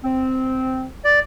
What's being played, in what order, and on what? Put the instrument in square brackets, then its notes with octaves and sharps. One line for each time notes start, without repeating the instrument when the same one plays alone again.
[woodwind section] C4
[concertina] D5